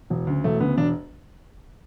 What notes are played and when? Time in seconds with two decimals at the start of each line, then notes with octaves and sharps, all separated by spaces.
0.10 E1
0.27 D2 C#3
0.44 E1 A3
0.60 D2 C#3 B3
0.77 E1 D4